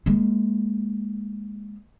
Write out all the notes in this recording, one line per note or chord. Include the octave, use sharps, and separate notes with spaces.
G#3 A#3